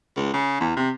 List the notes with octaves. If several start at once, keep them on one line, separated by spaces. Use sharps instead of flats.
C#2
C#3
E2
C3